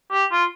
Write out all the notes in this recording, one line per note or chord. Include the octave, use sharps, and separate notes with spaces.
G4
F4